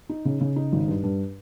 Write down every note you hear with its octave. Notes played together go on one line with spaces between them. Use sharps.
D#4
C#3
C#3
D#4
G#1
G2
G2